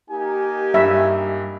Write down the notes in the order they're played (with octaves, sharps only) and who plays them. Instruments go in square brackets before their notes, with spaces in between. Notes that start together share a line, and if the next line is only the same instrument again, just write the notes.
[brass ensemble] A#3 D#4 G4 [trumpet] G#5
[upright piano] G2 [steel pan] E5